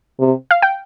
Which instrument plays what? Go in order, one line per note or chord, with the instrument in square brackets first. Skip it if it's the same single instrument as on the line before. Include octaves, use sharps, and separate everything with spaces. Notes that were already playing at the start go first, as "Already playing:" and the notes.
[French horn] C3
[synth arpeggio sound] F5
G5